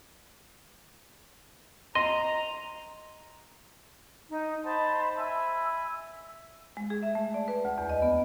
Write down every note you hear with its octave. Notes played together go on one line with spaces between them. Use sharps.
D#5 A#5 C6
D#4
C5 D#5 F#5 A5 B5 C6
E5 G#5 B5 E6
G#3
G#4
E5
A3
D5
B4
D2
E2
D#5
B3